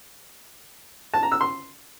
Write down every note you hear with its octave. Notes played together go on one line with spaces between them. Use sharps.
A5
A#5
E6
C6